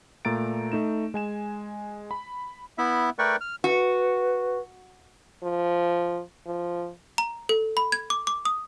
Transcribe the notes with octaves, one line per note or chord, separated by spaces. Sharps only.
A#2 A3 A#5 A6 D7
A3 D#4 E7
G#3 G#5 E7
B5
B3 E4 E5
A3 A#4 B4 D5 G5 C#6
F6
F#4 B4
F3
F3
A#5
A4
B5
G#6
D6
D6
D#6